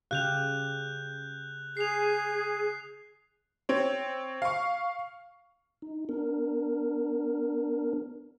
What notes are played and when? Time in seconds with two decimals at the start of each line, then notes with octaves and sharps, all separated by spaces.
0.11 C#3 G4 F5 F#6 G6 F7
1.77 G#4 C7 F7
3.69 C4 C#5
4.42 F5 C#6
5.82 D#4
6.09 B3 D4 A#4